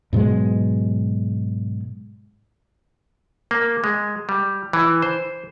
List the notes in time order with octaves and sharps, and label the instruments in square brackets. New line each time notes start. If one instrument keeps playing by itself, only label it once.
[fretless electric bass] G#2 B2 F#3 G#3
[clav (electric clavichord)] A#3
G#3
G3
E3
C5